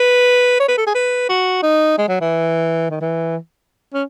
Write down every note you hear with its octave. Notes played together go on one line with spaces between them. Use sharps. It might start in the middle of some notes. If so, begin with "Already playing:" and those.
Already playing: B4
C#5
B4
A4
G#4
B4
F#4
D#4
G#3
F#3
E3
D#3
E3
C#4